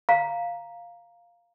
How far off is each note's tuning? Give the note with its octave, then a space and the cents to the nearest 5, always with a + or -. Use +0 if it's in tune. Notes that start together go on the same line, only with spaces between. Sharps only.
F5 +0 A#5 +0